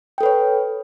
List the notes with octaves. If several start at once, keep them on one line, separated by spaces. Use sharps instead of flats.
A4 B4 C#5 G5